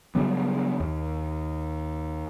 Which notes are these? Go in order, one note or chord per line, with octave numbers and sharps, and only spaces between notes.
C#3 F#3 G3 B3
D#2